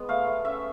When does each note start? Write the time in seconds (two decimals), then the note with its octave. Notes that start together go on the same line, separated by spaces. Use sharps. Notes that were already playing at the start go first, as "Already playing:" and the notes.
Already playing: G#3 B3
0.09 A3 F5
0.27 A3
0.45 C#4 E5